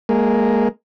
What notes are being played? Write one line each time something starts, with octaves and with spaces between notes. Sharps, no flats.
G#3 A#3